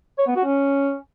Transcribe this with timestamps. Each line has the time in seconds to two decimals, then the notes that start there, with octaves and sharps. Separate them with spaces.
0.19 C#5
0.27 B3
0.36 F#4
0.45 C#4